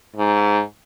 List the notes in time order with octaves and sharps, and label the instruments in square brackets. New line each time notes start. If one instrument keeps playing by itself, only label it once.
[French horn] G#2